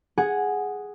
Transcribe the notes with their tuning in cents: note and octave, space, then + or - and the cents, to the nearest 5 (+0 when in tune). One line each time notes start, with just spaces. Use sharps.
G#4 +0 F#5 +0